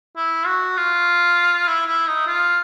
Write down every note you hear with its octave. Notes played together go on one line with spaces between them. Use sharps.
E4
F#4
F4
E4
E4
D#4
F4